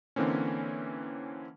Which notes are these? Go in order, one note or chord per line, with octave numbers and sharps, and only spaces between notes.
D3 E3 A#3 C4 C#4